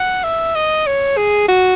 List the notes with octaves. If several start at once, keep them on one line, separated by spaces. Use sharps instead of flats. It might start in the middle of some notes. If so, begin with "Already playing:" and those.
Already playing: F#5
E5
D#5
C#5
G#4
F#4